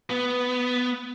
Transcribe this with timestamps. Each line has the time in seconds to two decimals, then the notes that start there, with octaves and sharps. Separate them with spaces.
0.10 B3